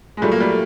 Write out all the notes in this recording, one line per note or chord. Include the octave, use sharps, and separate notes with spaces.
G#3
A#2 F#3 G3 A3
A#3
G3 A3